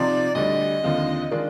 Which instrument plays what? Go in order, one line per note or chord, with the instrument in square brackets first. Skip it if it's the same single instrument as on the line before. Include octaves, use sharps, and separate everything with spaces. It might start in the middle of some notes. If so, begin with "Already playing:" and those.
Already playing: [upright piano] C3 F3 C4 D#4 [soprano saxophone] D5
[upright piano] D2 D3 G3 [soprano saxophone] D#5
[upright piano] D#2 D3 F3 C4 F4
D#3 G#3 D4 F4